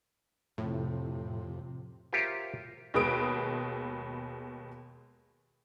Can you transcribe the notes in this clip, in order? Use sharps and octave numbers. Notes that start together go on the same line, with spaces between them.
F2 A2 C3
F4 G4 A#4 C5 C#5 E5
D#2 B2 G#3 B4 D#6 D7